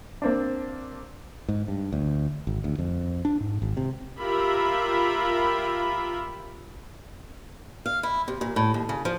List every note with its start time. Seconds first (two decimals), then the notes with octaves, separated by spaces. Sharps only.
0.22 A#3 C4 D4
1.49 G#2
1.68 G2
1.93 D2
2.47 G#1
2.64 D2
2.79 F2
3.25 D4
3.41 G#2
3.62 G#1
3.77 C3
4.18 F4 G4 A#4 E5 B5
7.86 F5
8.03 E4
8.28 C3
8.41 A#2
8.56 A2
8.74 D#2
8.89 C#3
9.05 F3